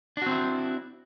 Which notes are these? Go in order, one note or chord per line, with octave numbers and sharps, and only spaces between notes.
C4 D4 E4 F#4